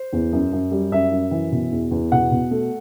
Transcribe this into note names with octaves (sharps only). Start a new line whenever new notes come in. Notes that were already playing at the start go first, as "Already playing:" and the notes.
Already playing: C5
E2
F#2
F#2
G3
F#2 E5
F#2
E3
B2
E2
E2
B2 F#5
B2
A3